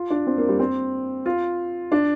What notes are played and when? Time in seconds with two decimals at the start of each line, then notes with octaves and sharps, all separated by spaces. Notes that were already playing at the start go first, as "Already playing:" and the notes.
Already playing: F4
0.10 D4
0.27 C4
0.38 A#3
0.48 G3
0.59 C4
1.26 F4
1.92 D4